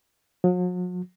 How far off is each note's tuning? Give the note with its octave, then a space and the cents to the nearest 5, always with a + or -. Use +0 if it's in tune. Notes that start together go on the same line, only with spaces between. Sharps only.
F#3 -45